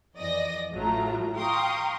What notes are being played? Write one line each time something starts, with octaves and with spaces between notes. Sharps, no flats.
F2 E3 D5 D#5 D#6 A#6
A1 A2 F#3 A3 F4 A#5
F5 G5 A#5 C6 C#6 D#6